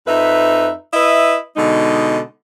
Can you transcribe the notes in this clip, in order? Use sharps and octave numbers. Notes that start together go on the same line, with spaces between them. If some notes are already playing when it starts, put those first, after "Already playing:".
F2 D#4 B4 E5
E4 B4 D#5 E5
B2 D3 G#3 D#4